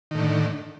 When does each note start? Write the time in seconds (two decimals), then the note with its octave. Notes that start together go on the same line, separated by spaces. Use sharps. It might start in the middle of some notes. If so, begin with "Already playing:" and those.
0.11 D#3
0.15 A2
0.19 D3